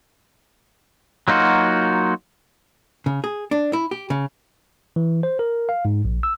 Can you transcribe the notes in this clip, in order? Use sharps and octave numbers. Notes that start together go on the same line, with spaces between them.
F#3 A#3 D#4 F4 F#4
C#3
G#4
D4
E4
G4
C#3
E3
C5
A#4
F5
G#2
A#1
E6